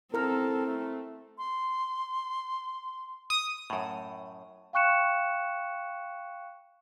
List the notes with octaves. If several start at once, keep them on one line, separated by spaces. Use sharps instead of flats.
C4 E4 A4 A#4 A#5 F6
A3
C6
D#6
F#2 A2
F5 G5 C#6 F#6 C#7 E7